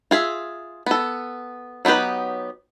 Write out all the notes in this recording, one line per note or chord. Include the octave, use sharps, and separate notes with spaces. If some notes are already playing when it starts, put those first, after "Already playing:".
F4 G#4 E5
B3 A4
F#3 B3 D#4 G4 B4